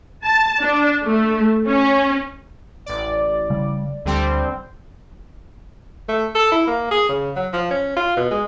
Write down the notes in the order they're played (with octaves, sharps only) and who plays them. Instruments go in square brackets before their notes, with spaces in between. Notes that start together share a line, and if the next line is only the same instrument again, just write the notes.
[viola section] A5
D4
A3
C#4
[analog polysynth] A1 D5
[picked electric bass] C#3 G3
[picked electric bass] D2 [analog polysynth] D3 G3 C4
[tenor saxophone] A3
A4
E4
A#3
G#4
C#3
F#3
F3
C#4
F4
B2
G#3